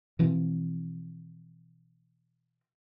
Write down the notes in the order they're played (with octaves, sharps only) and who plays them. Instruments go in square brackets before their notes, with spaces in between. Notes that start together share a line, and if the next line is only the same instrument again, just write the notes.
[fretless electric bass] B2 E3 F3 C4